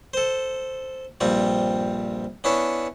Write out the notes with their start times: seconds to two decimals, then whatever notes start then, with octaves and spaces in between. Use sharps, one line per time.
0.14 A4 C5
1.21 A#1 G2 G3 C4 F4
2.44 B3 C#4 D4 E4 C#5